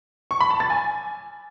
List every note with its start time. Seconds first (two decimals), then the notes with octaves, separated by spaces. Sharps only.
0.31 C#6
0.41 B5
0.50 A5
0.60 A6
0.70 G#5